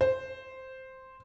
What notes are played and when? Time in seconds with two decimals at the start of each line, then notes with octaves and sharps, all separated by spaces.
0.01 C5